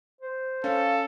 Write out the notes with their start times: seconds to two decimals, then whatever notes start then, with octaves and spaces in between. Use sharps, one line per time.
0.21 C5
0.64 C#4 A4 F5